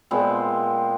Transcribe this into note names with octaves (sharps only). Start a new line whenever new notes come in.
A#2 G#3 B3 C4